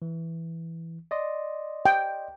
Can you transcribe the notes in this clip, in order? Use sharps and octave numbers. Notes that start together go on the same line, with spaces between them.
E3
D5 D#5 C6
G5